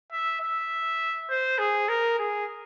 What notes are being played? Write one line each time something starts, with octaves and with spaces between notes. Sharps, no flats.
E5
E5
C5
G#4
A#4
G#4